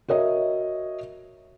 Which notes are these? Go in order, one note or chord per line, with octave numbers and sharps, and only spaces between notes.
F#4 A#4 C#5 D#5 E5